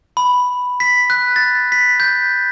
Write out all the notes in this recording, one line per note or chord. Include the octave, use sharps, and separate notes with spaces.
B5
B6
F#6
A6
B6
G6